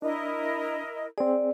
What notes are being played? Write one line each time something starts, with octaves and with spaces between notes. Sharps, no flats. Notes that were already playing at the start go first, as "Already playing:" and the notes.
D4 E4 A#4 D#5
C4 G#4 D5